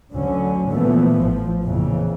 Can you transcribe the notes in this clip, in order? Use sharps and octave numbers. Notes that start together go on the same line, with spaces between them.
D2 D3 F#3 C#4
A#2 E3 F3 A3 B3
A1 A2 F3
F2 A#2 C#3 E3